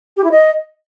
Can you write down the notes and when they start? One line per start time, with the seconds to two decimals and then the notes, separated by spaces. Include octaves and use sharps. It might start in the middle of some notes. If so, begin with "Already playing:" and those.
0.17 G4
0.24 E4
0.31 D#5